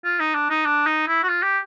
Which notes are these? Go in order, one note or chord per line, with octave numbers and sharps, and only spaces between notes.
F4
D#4
D4
D#4
D4
D#4
E4
F#4
F4
G4